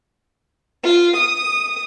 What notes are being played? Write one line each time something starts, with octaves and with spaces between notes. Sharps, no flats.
F4
D#6